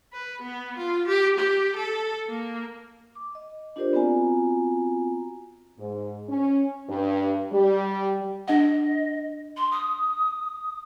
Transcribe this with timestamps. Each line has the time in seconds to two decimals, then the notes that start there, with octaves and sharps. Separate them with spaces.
0.13 B4
0.42 B3
0.77 F4
1.08 G4
1.38 G4
1.76 A4
2.27 A#3
3.15 D6
3.35 D#5
3.76 D4 F4 G4 A#4 C5 D5
3.93 B3 C4 F4 F#4 G#5 A#5
5.78 G#2
6.29 C#4
6.88 G2
7.51 G3
8.48 D4 D#5 F#5
9.57 C6
9.71 D#6